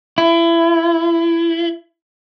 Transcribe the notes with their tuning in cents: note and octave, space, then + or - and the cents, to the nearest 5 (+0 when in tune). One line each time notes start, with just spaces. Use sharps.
E4 +25